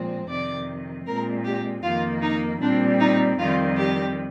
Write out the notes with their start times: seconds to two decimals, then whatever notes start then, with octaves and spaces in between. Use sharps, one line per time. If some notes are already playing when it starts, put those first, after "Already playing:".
Already playing: A#2 F3 G#3 C4
0.28 F2 C3 D#3 D5
1.05 A#2 G#3 C4 A#4
1.44 G4
1.82 F2 D#3 A#3 F4
2.22 D#4
2.60 A#2 G3 C4 D4
3.00 D#4
3.38 F2 D#3 G3 C4 F4
3.76 G4